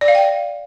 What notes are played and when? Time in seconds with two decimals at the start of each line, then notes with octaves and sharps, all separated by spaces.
0.01 D5
0.08 F5
0.15 G5